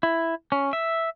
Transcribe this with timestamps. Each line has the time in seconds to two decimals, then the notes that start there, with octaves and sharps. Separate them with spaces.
0.03 E4
0.52 C#4
0.73 E5